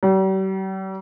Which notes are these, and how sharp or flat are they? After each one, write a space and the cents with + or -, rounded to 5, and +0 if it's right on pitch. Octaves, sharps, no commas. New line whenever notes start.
G3 -45